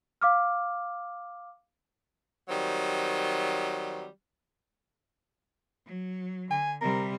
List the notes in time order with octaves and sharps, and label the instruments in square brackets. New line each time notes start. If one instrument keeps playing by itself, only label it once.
[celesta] F5 D6 F6
[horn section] D#3 F#3 G3 C4
[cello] F#3
[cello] D3 [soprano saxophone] G#5
[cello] C3 G3 [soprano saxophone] A#4